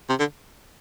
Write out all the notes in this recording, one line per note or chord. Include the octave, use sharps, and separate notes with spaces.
C3
D3